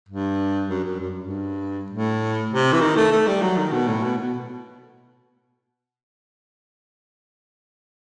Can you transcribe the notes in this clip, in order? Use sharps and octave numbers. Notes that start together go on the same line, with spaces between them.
G2
F#2
F#2
F#2
G2
A2
C3
E3
D#3
A3
A3
G3
F#3
D#3
B2
A2
B2
B2